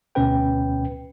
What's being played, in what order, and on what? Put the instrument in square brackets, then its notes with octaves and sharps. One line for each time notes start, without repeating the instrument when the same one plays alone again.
[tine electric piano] D2 B2 C#4 B4 G5